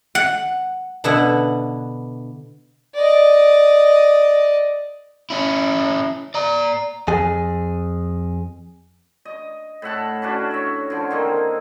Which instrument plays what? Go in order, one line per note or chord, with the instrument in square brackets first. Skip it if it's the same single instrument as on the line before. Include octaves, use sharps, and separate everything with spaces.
[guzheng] F#5
B2 D3 E4 B4 E5 F#5
[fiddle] D5 D#5
[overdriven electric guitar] C#4 E4
D5 A#5
[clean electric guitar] F2 G#4
[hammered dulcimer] D#5
A2 E5 F#5 A5
C#4 D4 F#4
C#5 E5
D3 F3
D#3 A#3 C4